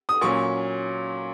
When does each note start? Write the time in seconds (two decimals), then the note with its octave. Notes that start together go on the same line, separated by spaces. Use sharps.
0.09 D#6
0.21 A#2 F#3 C#4 C#6